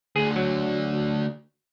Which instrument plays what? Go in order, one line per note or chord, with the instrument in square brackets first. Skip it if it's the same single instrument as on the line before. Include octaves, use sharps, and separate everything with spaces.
[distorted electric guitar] D2 D3 [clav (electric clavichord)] G#4
[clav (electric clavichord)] F#3